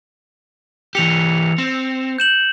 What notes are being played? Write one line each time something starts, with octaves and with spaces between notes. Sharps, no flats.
E3 G4 C#7 F7
C4
G6 E7 F#7